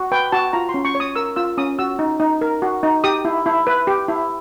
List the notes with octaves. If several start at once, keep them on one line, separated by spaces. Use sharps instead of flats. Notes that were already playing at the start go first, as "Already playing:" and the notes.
Already playing: F#4
B4 G5
F#4 A5
F4 A#5
C6
C#4
C#6
C#5
D#6
A#4 E6
F4 E6
C#4 D#6
F#4 E6
D#4
D#4
A#4
F#4
D#4
G4 D#6
E4
E4
B4
G4
E4